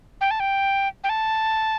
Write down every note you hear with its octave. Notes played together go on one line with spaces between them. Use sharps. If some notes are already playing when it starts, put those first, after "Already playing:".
G5
A5
G5
G5
A5